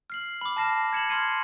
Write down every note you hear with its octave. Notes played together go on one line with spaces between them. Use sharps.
F6 C7 F#7
B5 D6
A5 F6 A#6 C7 E7
G#6 C#7 E7 F#7
C6 F6 G#6 C7 D#7 F#7